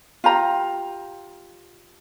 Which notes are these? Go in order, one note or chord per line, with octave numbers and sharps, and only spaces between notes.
F4 G4 A#5